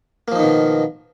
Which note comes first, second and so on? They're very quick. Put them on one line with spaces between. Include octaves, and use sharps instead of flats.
A#3 F3 D#4 D#3 B2